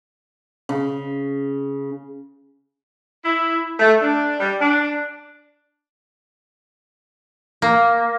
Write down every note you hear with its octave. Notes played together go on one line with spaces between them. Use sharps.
C#3
E4
A3
D4
G3
D4
A#3